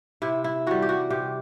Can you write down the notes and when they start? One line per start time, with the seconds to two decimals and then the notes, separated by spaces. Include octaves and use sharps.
0.22 C3 E4
0.44 E4
0.67 E3 G3 F#4
0.82 G4
0.89 F#4
1.10 C3 G4